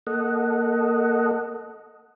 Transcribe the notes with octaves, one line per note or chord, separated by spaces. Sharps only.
A#3 A4 D#5 F#5